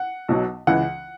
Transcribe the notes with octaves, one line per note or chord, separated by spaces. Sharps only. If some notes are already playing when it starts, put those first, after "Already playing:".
Already playing: F#5
B1 B2 F#3
C#2 C#3 E3 F#5